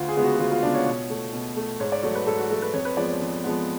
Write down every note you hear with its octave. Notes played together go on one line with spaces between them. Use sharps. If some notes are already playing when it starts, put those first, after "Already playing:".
Already playing: D2 F4
G#4
C#3 G#3 B3
F#4
D2 F4
F4
C#3 G#3 B3 D4
C#5
B2
A3
B2
A3
G#2 C#5
D5
F#3 A3 C#5
B4
G#2 A4
F#4
F#3 A3 A4
B4
F2 C#5
B4
F3 G#3 B3 D5
C#5
F2
F3 G#3 B3